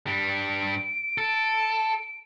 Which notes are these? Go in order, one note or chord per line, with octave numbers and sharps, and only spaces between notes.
G2 G3 D7
A4